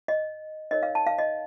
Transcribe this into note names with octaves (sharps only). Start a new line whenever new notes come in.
D#5
D#4 A#4 C#5 D#5
F5
A5
F5
D#5